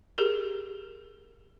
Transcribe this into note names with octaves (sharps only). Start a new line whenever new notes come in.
G4 G#4 A#4